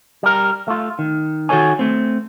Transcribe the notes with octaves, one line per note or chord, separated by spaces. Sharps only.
G3 A#4
A3 F4
D#3
D#3 F#4 A4 C5 C#5 G#5
A3 C4